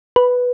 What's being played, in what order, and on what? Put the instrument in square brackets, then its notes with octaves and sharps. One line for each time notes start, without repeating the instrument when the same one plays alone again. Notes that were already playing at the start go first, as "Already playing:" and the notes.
[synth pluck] B4